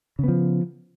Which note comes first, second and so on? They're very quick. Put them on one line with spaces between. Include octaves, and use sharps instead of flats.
C#3 B3 F3